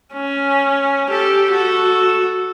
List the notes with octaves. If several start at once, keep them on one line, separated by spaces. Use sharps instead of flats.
C#4
G4 A4
F#4 A4